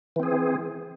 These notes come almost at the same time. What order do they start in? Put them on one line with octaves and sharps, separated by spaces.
E3 C4 G#4